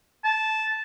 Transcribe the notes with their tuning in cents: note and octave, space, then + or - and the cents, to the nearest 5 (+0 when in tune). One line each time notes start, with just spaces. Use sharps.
A5 -10